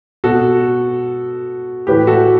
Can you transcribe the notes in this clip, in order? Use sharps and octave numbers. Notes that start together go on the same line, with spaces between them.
B2 F#4 A4
A2 E3 G4 B4
F#4 A4